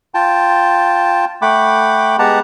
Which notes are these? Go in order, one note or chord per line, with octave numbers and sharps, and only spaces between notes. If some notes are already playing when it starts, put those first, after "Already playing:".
F4 G5 A5
A3 F#5 G5 B5 D6
G#3 B3 G4 F#5 A5 A#5